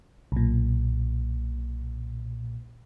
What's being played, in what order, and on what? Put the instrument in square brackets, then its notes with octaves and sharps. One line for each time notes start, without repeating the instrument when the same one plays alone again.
[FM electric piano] B1 A#2